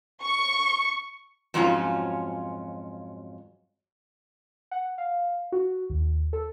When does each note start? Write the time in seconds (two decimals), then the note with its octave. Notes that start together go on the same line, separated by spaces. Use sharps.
0.23 C#6
1.54 F2 G#2 F#3 C#4 F4
4.71 F#5
4.98 F5
5.52 F#4
5.90 D#2
6.33 A4